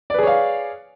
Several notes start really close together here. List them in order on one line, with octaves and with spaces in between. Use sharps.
D5 B4 G#4 C#5 F5